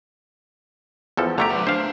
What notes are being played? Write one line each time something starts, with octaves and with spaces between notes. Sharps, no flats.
E2 F3 A4
D3 A3 G4 A#5
F#3 B4
D4 C5 F5